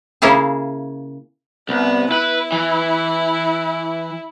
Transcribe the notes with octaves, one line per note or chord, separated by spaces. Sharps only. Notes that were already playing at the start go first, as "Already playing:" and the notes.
C#3 A#3 C#4 E4 G#4 A5
C2 B3
E4 B4
E3